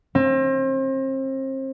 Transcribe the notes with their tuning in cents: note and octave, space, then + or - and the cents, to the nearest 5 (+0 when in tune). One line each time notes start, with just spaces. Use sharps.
C4 +35